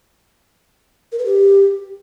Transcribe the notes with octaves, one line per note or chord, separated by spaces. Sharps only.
A#4
B4
G4